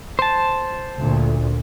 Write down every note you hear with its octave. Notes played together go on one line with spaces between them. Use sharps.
C5 A5
D2 A#2